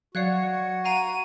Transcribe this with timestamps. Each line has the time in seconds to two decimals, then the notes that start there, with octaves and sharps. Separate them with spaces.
0.15 F#3 F#4 D5 F5 F#6 G#6 C#7
0.85 F5 F#5 A#5 D7 D#7